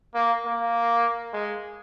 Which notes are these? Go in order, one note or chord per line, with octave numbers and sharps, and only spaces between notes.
A#3
A#3
G#3